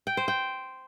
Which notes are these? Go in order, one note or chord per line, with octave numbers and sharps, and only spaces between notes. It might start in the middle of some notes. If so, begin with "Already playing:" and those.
G5
C5
G5